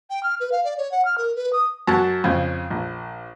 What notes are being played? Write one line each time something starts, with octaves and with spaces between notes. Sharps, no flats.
G5
F6
B4
F5
D5
C#5
F#5
F6
A#4
B4
D#6
F#2 F#3 F#5 A5
F2 C#3
A#1